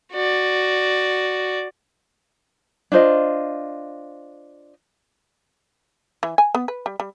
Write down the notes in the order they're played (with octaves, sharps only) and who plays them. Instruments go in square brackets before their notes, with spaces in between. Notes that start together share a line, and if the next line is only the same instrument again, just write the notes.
[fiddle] F#4 D5
[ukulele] D4 F4 C5 D#5
[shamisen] E3
G#5
B3
B4
G3
G3